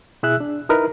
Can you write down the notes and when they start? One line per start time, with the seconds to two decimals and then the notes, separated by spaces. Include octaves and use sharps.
0.23 B2 E4 G#4 E5 E6 F#6
0.40 D4
0.69 D#4 E4 A#4 B4